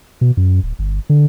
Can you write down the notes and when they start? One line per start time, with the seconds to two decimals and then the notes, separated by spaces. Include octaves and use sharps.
0.21 B2
0.37 F#2
0.63 D1
0.79 G1
1.10 D3